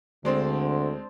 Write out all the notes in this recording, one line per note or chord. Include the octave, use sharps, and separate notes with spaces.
D2 D3 G#3 C4 D4 C5